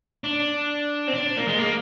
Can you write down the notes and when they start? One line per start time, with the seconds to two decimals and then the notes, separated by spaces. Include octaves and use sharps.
0.24 D4
1.08 C4
1.14 D4
1.37 A#3
1.48 G#3
1.59 A#3